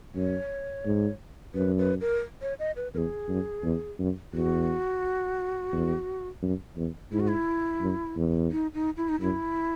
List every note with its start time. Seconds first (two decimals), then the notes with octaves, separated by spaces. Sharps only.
0.15 F#2 C#5
0.86 G#2
1.55 F#2 B4
1.78 B4
2.01 A#4
2.42 C#5
2.59 D#5
2.76 B4
2.94 E2 G#4 A#4
3.29 F#2
3.63 E2
3.99 F#2
4.33 E2 F#4
5.72 E2
6.42 F#2
6.77 E2
7.12 G#2 E4
7.20 F#4
7.28 E4
7.81 F#2
8.16 E2
8.51 D#4
8.74 D#4
8.97 E4
9.09 D#4
9.21 F#2 E4